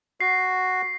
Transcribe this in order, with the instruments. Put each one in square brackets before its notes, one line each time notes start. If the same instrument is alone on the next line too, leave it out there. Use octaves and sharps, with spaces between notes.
[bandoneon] F#4 [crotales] C7